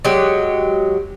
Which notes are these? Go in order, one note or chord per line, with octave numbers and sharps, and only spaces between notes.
F#3 G#3 G4